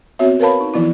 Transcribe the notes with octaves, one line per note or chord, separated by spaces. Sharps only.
B3 C4 F#4 C#5 E5
A#4 B4 C#5 F5 A5 B5
D#4
E3 F3 B3 E4